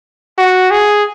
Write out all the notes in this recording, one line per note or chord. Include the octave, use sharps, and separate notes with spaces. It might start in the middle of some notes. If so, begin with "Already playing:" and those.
F#4
G#4